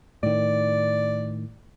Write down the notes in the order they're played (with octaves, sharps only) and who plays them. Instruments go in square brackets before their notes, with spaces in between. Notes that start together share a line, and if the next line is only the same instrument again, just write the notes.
[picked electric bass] A2 D#3 [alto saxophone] D5